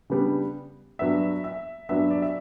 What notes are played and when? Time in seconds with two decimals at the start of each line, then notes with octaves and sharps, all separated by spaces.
0.10 C#3 G3 B3 D4
0.99 G2 F#3 B3 D4 E5
1.44 E5
1.89 G2 F#3 B3 D4 E5
2.10 D5
2.22 E5